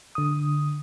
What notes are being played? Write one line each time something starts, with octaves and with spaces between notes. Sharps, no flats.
D3 D#6